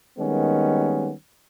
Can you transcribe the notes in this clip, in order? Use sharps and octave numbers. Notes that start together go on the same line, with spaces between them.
D#3 G3 G#3 A#3 B3 C#4